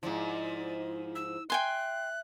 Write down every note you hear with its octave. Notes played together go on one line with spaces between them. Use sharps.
G#2 F3 E4 D5
E6
E5 G5 G#5 C6 F#6